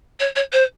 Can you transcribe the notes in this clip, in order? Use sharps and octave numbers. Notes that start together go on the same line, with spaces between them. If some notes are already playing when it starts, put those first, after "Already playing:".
C#5
C#5
C5